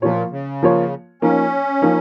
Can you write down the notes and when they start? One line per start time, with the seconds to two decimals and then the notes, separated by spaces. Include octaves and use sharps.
0.02 A#2 F3 A#3 F4 C#5
0.31 C#3
0.63 F3 A#3 F4 C#5
1.22 F3 A#3 C#4 D#4
1.82 F3 A#3 D#4